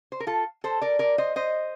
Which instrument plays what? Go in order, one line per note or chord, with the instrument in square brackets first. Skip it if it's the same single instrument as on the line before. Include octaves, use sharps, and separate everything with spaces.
[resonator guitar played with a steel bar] C5
A#4
F4 A4
A4 C5
A#4 D5
A#4 D5
C5 D#5
C5 D#5